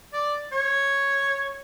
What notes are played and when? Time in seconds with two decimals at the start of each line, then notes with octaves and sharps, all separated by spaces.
0.13 D5
0.52 C#5